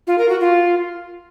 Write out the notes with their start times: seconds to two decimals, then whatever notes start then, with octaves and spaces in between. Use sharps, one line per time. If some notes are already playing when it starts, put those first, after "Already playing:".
0.07 F4
0.18 A#4
0.29 F#4
0.40 F4